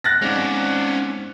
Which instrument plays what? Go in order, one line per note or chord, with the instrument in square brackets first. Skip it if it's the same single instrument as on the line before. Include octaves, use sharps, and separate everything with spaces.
[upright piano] F#6 A6 A#6
[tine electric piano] G#3 C4 D#4 [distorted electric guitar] C#4 D5 [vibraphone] C5 F5 F#5